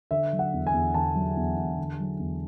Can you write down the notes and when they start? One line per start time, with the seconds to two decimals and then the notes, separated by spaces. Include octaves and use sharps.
0.11 D3 E5
0.33 F#3
0.39 F#5
0.54 E2
0.67 G#5
0.73 E2
0.94 D3 A5
1.15 F#3
1.37 E2
1.57 E2
1.78 D3
2.00 F#3
2.19 E2